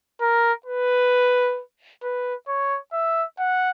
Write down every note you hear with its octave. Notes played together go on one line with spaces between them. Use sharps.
A#4
B4
B4
C#5
E5
F#5